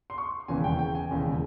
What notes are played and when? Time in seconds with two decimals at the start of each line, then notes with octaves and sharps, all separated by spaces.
0.10 C6
0.18 C#6
0.48 E1 D#2 C#3 E3 G#5
0.64 G5
0.79 G5
0.95 G#5
1.10 E1 D#2 C#3 E3